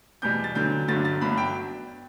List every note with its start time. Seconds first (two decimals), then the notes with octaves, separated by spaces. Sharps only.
0.22 E2 B2 G3 G6
0.44 A6
0.55 D2 D3 F#3 G6
0.88 G1 G2 D3 F#3 A6
1.05 A6
1.21 G1 G2 F#3 B5
1.37 G5